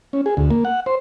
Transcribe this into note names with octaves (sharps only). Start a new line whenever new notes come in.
C#4
G#4
D2
A#3
F#5
C5